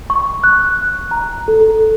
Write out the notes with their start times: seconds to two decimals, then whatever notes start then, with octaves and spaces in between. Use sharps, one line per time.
0.10 C#6
0.44 F#6
1.11 A#5
1.48 A4